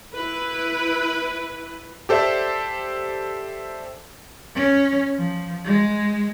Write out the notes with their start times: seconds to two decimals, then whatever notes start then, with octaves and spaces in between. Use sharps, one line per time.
0.14 E4 B4
2.09 G4 A4 C5 D5 E5
4.55 C#4
5.17 F3
5.65 G#3